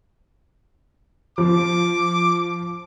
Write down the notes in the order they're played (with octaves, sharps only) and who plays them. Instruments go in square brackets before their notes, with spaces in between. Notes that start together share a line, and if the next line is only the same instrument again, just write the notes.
[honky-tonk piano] F3 [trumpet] D6